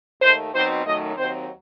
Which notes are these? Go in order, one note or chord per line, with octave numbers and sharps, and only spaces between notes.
D#2 D#3 A3 C5
B2 F#3 C4 D#4 C5
F#2 D#3 F#3 A3 D#4 D#5
D#2 D#3 F#3 C4 C5